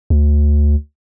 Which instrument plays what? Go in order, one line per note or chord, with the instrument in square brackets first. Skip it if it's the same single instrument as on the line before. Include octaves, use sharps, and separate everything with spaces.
[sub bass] D2